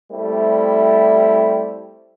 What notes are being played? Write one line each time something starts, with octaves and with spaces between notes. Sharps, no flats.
G3 A3 C4 E4